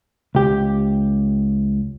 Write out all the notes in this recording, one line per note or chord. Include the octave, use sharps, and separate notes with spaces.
C#2 G4